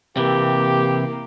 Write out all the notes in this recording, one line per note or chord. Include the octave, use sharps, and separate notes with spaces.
C3 E3 A#3 G4